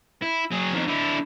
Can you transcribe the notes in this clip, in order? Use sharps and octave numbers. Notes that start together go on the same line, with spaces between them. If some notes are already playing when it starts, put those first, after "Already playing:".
E4
F#3 G#4
F2 D#3
D3 E4